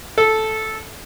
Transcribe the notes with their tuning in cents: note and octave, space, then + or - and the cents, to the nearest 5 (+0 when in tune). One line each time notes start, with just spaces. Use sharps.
A4 -10